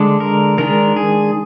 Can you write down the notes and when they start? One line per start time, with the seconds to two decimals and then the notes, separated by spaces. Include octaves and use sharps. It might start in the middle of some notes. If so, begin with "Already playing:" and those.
Already playing: D3 G#3 D4
0.20 A#4
0.58 D#3 G#3 D4 A#4
0.96 G#4